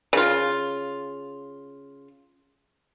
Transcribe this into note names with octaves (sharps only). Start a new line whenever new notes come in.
C#3 F4